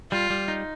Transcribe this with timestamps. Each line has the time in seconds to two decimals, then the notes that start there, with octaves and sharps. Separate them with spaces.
0.11 G3 F4
0.30 G3
0.48 D#4